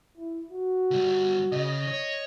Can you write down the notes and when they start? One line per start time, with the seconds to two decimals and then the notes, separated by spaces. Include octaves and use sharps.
0.17 E4
0.51 F#4
0.91 D3 G3
1.52 C#3 D#5
1.87 C#5